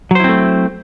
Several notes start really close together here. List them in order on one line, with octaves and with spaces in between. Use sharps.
F#3 C5 E4 C4 A3